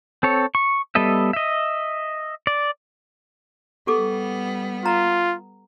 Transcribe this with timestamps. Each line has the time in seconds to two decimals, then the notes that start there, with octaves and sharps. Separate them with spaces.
0.23 C4 A4 C#5
0.55 C#6
0.95 G3 B3 A4 D#5 E5
1.33 D#5 E5
2.47 D5
3.87 G3 B3 G4 A4 D6
4.86 F4 A#5